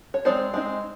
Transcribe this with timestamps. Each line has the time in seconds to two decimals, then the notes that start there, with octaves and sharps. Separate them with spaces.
0.14 C#5
0.25 G#3 C4 D#4 C5 D5
0.54 G#3 C4 D#4